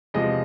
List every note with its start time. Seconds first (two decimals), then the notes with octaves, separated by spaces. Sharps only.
0.14 E2 C3 F3 G#3 D#5